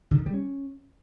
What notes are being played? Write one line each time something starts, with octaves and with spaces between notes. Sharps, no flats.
D3
D#3
G3
C#4